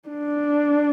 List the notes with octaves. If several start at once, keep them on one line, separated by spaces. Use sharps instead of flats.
D4